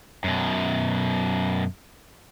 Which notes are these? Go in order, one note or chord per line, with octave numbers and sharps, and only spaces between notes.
F#2 B2